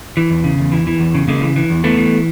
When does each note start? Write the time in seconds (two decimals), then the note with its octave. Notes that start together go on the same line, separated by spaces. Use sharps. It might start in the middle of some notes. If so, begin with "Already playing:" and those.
0.17 E3
0.30 E2
0.44 C#3
0.59 E2
0.72 E3
0.87 E3
1.00 E2
1.14 C#3
1.28 C#3 G#3 A#3
1.42 E3
1.56 E3
1.70 E2
1.84 E3 A3 B3
1.97 E3